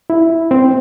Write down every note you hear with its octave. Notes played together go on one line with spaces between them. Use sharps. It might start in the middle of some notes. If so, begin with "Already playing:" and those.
E4
C4